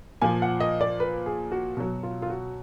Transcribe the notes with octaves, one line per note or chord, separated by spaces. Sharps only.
A#2 F3 G#5
F#5
D#5
D5
B4
G#4
F#4
B2 F#3 F#4
F4
F4
F#4